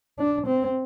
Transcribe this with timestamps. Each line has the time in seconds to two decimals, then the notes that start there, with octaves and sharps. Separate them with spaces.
0.19 D4
0.47 C4